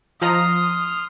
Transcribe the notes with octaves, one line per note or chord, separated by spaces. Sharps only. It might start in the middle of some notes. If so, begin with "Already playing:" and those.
F3 D#5 A#5 C6 D#6 F6